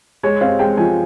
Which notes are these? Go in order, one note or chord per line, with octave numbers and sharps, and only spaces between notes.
G#3 C#5
C4 F5
G#3 G5
F3 G#5